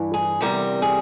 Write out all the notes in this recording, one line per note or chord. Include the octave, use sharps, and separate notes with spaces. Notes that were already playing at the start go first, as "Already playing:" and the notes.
Already playing: G2 E3
G#4
E2 C3 G3 A#4
G#4